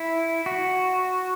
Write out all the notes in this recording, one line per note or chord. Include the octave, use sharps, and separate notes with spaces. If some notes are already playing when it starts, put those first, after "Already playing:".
Already playing: E4
F#4